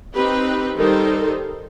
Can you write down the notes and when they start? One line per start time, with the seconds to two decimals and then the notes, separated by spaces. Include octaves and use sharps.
0.14 C4 D#4 G4 B4
0.77 D#3 G3 D#4 A4 C5